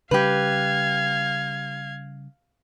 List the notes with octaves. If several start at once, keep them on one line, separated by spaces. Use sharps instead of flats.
C#3 G3 G4 B4 F5 G#6